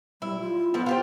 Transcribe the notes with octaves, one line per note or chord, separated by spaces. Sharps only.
G3 E4
F4
F3 B3 A4 B4
F4 G4 C5